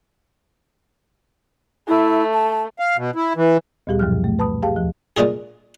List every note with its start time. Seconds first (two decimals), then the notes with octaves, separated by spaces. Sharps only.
1.88 A3 E4
2.34 A5
2.79 F5
2.97 B2
3.15 E4
3.36 E3
3.87 D2 A#2 G3 G4 G#4
3.99 F#2 B2 F3 F#3 F6
4.24 A3
4.39 B4 A5 B5 D#6
4.62 G4 G#4 F5 G5 A5
4.76 D#2 F3
5.17 A#2 G#3 D4 F4 G#4